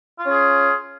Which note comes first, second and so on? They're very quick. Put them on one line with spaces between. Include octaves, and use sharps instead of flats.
F4 C#4 G#4